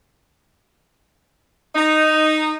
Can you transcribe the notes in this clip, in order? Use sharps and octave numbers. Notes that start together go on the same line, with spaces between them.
D#4